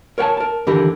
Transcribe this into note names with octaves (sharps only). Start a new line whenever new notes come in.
A#4 C#5 F5 F#5 G#5 A5
A#4 A5
D#2 D3 E3 G4 A#4 B5